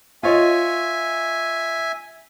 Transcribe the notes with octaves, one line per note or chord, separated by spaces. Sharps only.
F4 C#5 D#5 E5 G#5